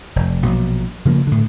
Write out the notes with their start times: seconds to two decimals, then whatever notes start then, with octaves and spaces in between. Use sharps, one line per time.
0.16 F1
0.43 A#1 B2 F#3
1.05 C#3 F3 G#3 A#3
1.27 A2 D3